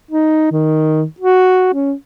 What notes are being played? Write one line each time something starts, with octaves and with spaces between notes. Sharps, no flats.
D#4
D#3
F#4
C#4